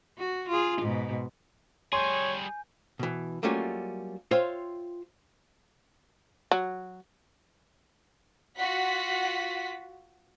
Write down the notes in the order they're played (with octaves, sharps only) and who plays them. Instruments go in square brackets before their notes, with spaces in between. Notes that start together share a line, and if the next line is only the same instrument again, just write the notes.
[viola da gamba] F#4
F4 G#4
G#2 B2
[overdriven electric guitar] G3 G#4 [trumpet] C#5 [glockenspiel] G#5 G6 [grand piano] C6
[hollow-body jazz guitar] B2 E3
F#3 G3 A3 A#3 C#4 F4
F4 C5 C#5 E5 F5 G5
[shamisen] F#3
[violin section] F4 F#4 F#5 B6